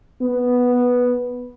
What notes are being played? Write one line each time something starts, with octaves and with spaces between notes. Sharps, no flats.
B3